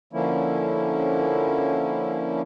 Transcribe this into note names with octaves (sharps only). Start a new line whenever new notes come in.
D3 F3 A#3 C#4 E4